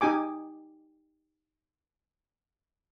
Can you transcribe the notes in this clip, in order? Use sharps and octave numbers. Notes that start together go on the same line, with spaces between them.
D#4 G4 G#5 D6